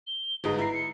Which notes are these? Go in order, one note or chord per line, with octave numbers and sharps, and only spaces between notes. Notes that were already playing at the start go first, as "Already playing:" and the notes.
G7
G1 G#2 G#3 D#6
E4 A#5 C7
C#7